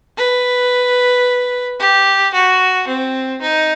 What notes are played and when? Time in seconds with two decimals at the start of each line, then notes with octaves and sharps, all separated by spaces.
0.17 B4
1.80 G4
2.34 F#4
2.88 C4
3.42 D#4